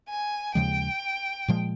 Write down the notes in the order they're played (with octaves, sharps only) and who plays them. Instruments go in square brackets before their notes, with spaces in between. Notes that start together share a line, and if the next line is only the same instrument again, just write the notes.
[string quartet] G#5
[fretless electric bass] D#2 C#3 F3 G#3 [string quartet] G5
[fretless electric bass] A#2 F3 G#3